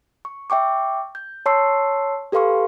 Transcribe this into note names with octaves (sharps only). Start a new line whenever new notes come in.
C#6
E5 G5 C#6 D6
G6
C#5 A5 C6 C#6 E6 C7
G4 A4 B4 F5 C6 C#6